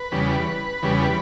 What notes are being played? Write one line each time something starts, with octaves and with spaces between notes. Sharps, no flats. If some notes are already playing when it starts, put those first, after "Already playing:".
Already playing: B4
E2 C#3 G3
E2 C#3 G3